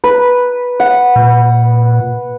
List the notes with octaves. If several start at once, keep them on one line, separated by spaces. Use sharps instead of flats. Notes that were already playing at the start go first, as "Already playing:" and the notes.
B4
F#5
A#2